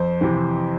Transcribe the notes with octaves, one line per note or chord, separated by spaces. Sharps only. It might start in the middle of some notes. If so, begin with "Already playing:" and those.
Already playing: F2 C5
C3 E3